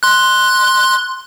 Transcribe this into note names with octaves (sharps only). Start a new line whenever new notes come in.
C6 F#6